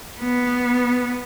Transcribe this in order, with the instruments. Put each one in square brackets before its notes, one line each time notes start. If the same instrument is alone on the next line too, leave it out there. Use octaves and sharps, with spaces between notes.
[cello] B3